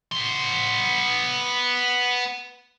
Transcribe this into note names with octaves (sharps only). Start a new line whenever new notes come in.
B3 C6